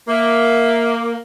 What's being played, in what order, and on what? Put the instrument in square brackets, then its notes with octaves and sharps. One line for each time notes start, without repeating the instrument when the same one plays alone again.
[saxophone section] A#3 [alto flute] E5